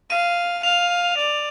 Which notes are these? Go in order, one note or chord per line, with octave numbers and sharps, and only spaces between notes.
F5 D#7
F5 F7
D5